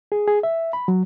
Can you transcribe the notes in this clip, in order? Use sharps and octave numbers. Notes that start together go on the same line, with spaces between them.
G#4
G#4
E5
B5
F#3